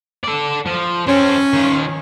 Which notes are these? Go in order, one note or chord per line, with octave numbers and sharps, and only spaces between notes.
A4 D5
F3
C4 C#4 A4
D#3 F4